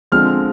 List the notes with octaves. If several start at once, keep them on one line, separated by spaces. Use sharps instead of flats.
D3 F3 G#3 C4 F6